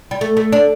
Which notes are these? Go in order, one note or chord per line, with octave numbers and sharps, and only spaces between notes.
G3
A3
A3
D4